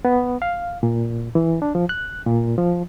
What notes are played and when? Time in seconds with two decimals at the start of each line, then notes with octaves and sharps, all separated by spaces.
0.05 B3
0.42 F5
0.83 A#2
1.35 E3
1.62 D4
1.75 F3
1.89 F#6
2.26 A#2
2.58 F3